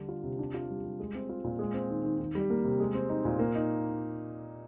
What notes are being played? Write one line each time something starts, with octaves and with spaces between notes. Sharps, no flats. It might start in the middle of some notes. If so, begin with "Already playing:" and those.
Already playing: D3 G3 D4
F4
C3
D4
F4
G3
G3
G#3
C4
F4
A#2
G#3
C4
D#3
D#3
D#3
G3
A#3
C3
G#3
C4
D#4
A#2
A#3
D#4